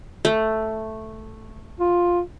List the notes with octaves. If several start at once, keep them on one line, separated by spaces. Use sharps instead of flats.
A3
F4